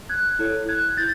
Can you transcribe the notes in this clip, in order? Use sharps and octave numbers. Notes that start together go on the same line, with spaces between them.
F#6 G#6
E4 A4 C#5
F#6 G#6
E4 G6 A6